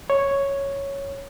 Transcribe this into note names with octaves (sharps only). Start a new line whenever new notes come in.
C#5